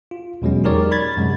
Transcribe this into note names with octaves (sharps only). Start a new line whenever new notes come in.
F4
E2 B2 F#3 G#3 C#4
D#4 G4 G#4 A#4 C#5 D5
B5 G#6 A6
F#2 C3 G#3